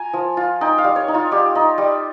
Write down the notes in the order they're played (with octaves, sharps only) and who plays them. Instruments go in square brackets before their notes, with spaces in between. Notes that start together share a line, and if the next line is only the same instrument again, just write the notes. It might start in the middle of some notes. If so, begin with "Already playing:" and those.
Already playing: [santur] F4 G#5 A#5
F3
F4
D#4 G5
F5
G3
C#5
D#4
F4
G3 G4
D#4
G3